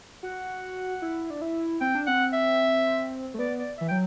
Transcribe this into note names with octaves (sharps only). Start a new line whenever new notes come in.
F#4 F#5
E4
D4
E4
C4 G5
D4
C4 F#5
E5
A3
B3 D5
D5
E3 E5
F#3 G5